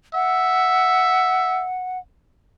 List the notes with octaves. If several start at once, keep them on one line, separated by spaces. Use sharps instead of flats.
E5 F#5